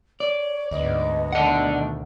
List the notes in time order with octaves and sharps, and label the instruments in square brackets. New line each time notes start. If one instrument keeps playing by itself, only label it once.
[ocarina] C#5 [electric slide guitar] D5
[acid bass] D2 [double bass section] G#2 B3 [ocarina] D#5
[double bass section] B2 D#3 A3 [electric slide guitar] D4 F#5